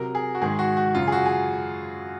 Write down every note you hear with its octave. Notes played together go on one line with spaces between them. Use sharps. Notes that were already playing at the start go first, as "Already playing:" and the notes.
Already playing: C3 F#3 A#4
G#4
F#4
G#2 D#3 G#3 G#4
F#4
F#4
F#2 C#3 F#3 F4
G#4
F#4
G#4